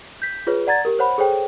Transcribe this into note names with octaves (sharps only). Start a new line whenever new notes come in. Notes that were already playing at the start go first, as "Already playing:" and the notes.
G6 B6
F4 G#4 B4 C#5
D5 F#5 A#5 G#6 A6
G4 A#4
C5 C#5 F#5 B5
G#4 A4 C5 C#5 G5